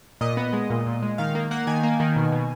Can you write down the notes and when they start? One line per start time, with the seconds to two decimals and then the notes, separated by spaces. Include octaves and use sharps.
0.21 A#2 D#5
0.37 B3
0.53 G#3
0.70 A#2
0.86 A#2
1.03 G#3
1.18 D#3 F5
1.35 A#3
1.51 A#3 F#5
1.67 D#3 G#5
1.83 A#3
2.00 D#3
2.16 B2
2.32 B2